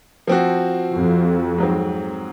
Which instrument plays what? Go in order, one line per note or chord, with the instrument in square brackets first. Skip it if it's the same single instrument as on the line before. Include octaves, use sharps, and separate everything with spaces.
[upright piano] F3 C4 F#4
[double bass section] F2
[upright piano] G#2 F#3 C4